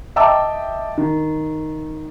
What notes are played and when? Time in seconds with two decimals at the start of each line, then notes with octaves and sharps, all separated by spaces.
0.16 D#5 E5 G5 A5 D6 E6
0.98 D#3